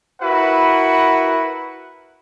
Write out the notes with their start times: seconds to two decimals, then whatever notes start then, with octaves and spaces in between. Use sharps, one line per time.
0.22 E4 F#4 A#4 B4 F#5